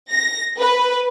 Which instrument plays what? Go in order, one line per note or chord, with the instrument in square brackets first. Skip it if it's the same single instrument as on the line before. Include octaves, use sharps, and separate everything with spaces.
[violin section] A#6
B4